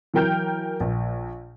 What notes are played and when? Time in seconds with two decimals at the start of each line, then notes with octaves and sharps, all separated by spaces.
0.14 E3 F#3 A#4 G5 F6 G6
0.80 A#1